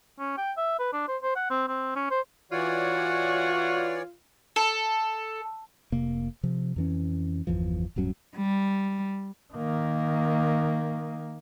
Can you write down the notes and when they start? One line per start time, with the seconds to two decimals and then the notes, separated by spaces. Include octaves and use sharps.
0.19 C#4
0.38 G5
0.57 E5
0.79 B4
0.93 D4
1.08 C5
1.22 C5
1.36 F#5
1.50 C4
1.68 C4
1.96 C#4
2.11 C5
2.52 E3 F4 F#4 C#5 D5
4.56 A4
5.92 F1 C3 A#3
6.43 C3 F3
6.76 F2 E3 C#4
7.47 G1 E2 E3 F3
7.96 D1 G2 F#3 C#4
8.36 G3
9.54 D#3 A#3